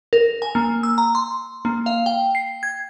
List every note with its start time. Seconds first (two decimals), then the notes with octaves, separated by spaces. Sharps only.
0.13 A#4
0.42 G#5
0.55 A#3
0.83 E6
0.98 A#5
1.15 C6
1.65 A#3
1.86 F5
2.06 G5
2.35 C7
2.63 G#6